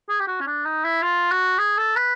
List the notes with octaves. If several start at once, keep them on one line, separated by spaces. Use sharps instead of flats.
G#4
G4
F#4
C#4
D4
D#4
E4
F4
F#4
G#4
A4
B4